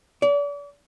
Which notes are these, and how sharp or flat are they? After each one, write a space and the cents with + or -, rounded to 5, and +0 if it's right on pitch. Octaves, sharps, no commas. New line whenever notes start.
D5 -40